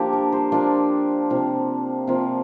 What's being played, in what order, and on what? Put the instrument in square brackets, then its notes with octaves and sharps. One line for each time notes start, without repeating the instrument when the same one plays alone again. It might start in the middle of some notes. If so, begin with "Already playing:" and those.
Already playing: [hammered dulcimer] F3 A#3 D4 G4
A#4
C5
F3 A#3 D4 D5
C3 F3 A#3
C3 F3 A#3